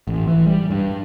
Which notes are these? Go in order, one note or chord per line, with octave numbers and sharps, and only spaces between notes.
A1
E3
G3
G2